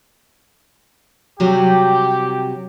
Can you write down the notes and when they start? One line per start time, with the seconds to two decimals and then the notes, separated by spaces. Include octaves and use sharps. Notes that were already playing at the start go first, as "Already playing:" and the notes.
1.40 C3 F#3 G3 G4